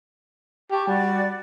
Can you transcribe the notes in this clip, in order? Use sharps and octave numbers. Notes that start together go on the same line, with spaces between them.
G4 A5 C#6
G3 F#4 D5